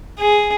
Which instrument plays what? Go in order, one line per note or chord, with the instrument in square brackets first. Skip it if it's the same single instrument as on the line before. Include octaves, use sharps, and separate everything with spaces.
[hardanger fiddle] G#4